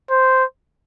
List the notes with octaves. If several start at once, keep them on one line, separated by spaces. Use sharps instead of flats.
C5